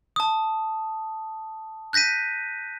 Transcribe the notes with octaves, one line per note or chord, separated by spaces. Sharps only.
A5 D#6
F#6 G6 A#6 B6 D#7